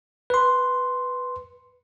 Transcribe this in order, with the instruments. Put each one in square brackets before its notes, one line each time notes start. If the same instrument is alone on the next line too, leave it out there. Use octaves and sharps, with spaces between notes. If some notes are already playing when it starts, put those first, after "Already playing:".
[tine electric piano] B4 C6